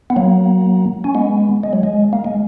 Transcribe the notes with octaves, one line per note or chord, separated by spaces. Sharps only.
B3
F#3 A#3
C#4
G#3 B3
G#3
F#3
G#3
A#3
G#3